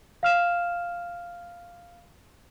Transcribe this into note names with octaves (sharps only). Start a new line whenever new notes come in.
F5 F6 E7